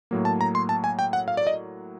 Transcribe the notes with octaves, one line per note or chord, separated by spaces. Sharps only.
A2 F#3 A#3
A5
A#5
C6
A5
G#5
G5
F#5
F5
D5
D#5